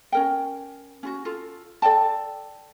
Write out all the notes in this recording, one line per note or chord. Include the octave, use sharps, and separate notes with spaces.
C#4 A#4 G5
C#4 F4 F#4
F4 A4
A4 D5 G5 A5